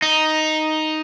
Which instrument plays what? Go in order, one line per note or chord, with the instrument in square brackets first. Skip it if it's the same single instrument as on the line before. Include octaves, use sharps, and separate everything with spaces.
[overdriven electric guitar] D#4